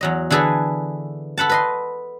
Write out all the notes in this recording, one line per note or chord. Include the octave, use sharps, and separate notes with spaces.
E2 F#3 D#5
D3 E3 G#4 A4 B4
A4 B4 F#5 A5
B4 D#5 C6